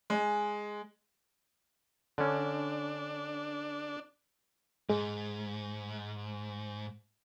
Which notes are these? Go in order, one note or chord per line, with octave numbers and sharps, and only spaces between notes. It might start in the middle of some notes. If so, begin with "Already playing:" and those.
G#3
D3 C#4 D4
G#2 G#3